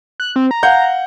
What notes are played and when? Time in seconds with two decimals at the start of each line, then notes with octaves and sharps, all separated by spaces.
0.20 F#6
0.36 C4
0.51 A#5
0.63 F5 F#5 G6